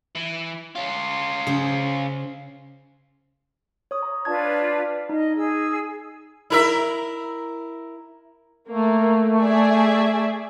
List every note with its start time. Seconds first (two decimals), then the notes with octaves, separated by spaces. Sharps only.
0.15 E3
0.75 C#4 F4
1.47 C#3 C5
3.91 C#5 D#6
4.03 A#5
4.25 D4 F4 B4 D5 A5 G#6
5.09 D#4 D#5
5.35 G#4 E6
6.50 E4 A#4 E5
8.69 A3 A#3
9.40 G#4 D5 E5